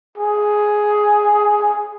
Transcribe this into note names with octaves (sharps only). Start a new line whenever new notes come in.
G#4